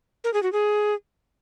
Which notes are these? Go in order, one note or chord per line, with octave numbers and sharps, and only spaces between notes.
A#4
G#4
F#4
G#4